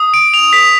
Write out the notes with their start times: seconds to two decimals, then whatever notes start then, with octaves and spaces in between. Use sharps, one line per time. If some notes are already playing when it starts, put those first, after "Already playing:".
Already playing: D#6
0.14 D7
0.34 F7
0.53 B6